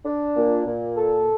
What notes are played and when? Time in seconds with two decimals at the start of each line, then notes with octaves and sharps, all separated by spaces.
0.05 D4
0.36 A#2
0.66 A#2
0.97 A4